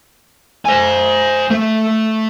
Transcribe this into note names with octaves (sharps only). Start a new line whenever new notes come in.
C5 G#5
A3